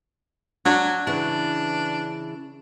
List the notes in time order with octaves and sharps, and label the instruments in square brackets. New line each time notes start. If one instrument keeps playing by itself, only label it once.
[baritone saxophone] F#3 [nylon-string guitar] D4
[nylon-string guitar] C#3 E3 [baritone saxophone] D4